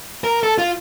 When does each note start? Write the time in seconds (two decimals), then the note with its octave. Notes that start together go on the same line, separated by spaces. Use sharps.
0.24 A#4
0.43 A4
0.58 F4